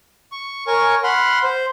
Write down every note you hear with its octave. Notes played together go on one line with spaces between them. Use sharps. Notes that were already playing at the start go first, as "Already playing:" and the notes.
C#6
A#4 C#5 G#5 C#6
F#5 B5 C6 F6
C5